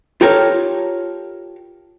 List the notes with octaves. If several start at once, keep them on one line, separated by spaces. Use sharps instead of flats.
F4 G4 A4 A#4 C#5